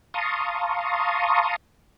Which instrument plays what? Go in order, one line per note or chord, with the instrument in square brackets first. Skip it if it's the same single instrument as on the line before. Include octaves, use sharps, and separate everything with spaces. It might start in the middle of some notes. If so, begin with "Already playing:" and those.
[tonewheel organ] F5 A5 A#5 C6 C#6 D#6